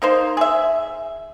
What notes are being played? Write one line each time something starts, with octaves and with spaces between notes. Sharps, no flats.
A#3 D#4 C5
G#4 E5